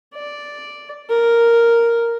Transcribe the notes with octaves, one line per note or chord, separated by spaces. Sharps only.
D5
A#4